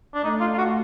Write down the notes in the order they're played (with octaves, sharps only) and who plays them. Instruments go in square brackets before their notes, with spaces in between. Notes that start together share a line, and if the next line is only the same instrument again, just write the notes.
[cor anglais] D4
[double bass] A3 [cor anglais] D#4
[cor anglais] F4
F4
F#4